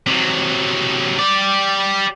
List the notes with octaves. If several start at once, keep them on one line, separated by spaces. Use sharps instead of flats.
C3 F#3
G4 D5